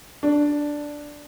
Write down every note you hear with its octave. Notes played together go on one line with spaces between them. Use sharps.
D4